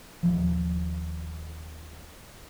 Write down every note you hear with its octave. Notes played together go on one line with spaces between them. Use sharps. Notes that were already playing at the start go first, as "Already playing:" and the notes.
D#1 A#1 F3